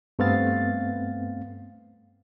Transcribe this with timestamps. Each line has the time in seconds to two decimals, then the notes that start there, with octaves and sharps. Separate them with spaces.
0.19 G2 A3 B3 C4 F5 A6